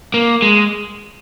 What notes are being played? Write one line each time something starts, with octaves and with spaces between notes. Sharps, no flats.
A#3
G#3